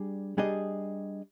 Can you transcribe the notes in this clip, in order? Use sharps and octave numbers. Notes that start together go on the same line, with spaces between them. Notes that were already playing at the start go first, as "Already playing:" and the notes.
Already playing: G3 D4 G#4
G3 D4 G#4 D#5